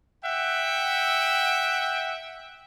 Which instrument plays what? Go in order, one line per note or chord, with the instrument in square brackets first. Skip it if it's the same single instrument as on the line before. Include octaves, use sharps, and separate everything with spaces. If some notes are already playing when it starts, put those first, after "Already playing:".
[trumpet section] E5 F#5 G5